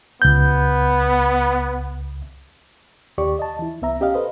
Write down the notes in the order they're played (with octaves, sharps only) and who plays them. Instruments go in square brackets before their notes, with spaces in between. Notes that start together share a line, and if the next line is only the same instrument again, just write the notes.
[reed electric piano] C#2 G6 [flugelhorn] B3
[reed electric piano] D#2 G4 D5 C#6
D#5 A5
E3 E4
C2 B3 E5 A#5
C#4 G4 D#5 F5
A4 B4 C5 D#5